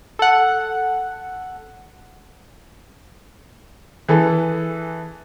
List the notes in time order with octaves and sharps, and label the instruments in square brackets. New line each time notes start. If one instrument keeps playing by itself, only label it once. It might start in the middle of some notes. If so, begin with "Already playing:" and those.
[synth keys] A4 F#5
[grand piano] E3 G#4 A4 B4